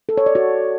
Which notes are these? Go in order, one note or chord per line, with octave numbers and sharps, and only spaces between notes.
A4
C#5
D5
F#4